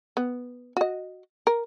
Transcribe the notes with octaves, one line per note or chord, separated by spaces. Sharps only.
B3
F#4 D#5
A#4